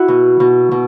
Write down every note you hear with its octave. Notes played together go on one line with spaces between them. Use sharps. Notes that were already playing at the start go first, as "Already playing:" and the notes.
Already playing: E4 F#4
B2
B2
B2